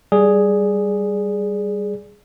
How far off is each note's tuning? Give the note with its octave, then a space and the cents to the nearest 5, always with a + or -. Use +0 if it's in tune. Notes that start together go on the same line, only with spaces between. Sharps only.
G3 +0 G#4 +0 D5 +0